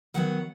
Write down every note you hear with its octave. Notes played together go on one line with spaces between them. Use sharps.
D#3 F#3 B3 F#5